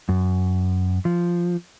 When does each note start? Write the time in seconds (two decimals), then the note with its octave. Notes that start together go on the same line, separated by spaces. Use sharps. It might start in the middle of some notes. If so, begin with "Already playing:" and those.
0.09 F#2
1.05 F3